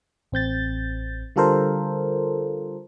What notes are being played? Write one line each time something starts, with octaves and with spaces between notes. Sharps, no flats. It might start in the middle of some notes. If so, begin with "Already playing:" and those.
A1 C4 G6 A6
D3 G3 F4 A4 A#4 C5